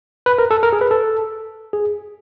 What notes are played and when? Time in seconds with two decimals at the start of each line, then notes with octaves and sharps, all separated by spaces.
0.26 B4
0.38 A#4
0.51 A4
0.63 A#4
0.73 G#4
0.81 B4
0.91 A4
1.73 G#4